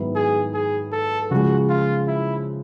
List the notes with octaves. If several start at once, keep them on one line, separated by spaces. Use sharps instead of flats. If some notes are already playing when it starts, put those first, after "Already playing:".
Already playing: G#2 D#3 F#3 B3 E4
G#4
G#4
A4
C#3 F3 G#3 F#4
F4
E4